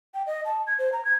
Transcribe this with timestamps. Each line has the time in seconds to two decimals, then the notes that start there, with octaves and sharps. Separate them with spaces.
0.14 G5
0.27 D#5
0.45 A5
0.67 G#6
0.79 C5
0.93 A#5
1.05 G#6